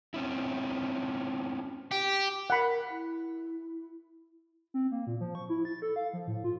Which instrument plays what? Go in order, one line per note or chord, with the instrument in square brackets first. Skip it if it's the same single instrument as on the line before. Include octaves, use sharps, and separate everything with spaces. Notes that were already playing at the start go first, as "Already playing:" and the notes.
[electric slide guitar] C4 C#4 E4
[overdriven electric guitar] G4
[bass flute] A#4 [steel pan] F#5 B5
[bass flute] E4
[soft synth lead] C4
A#3
A#2
F3
C#6
E4
A6
A4
F5
F3
A2
F4